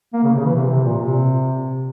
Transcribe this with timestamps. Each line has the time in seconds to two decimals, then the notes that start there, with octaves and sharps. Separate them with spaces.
0.13 A#3
0.23 C#3
0.34 C3
0.40 C#3
0.45 E3
0.56 C3
0.70 C3
0.84 A#2
0.98 C3